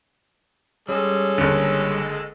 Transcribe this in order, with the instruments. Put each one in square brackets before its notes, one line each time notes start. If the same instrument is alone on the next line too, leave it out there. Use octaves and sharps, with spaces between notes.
[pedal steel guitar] G3 [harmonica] G#3 A4 [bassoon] C#4
[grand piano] F#1 D3